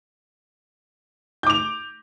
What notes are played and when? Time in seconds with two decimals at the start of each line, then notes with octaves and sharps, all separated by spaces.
1.43 G6
1.47 D6
1.50 F7